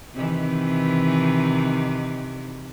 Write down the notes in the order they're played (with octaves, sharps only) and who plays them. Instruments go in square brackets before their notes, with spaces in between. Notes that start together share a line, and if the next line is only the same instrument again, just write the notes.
[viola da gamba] C3 D#3 E3